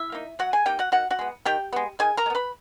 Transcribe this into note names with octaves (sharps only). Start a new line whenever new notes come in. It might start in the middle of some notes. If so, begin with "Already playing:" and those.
Already playing: E4 E5
A#3 D#4
F#3 F#4 F#5
G#4 G#5
A#3 D#4 G4 G5
F#4 F#5
D#3 F#4 F#5
F#4 F#5
G#3 B3
D#3 G4 G5
G#3 B3
D#3 G#4 G#5
A#4 A#5
G#3
B3
B4 B5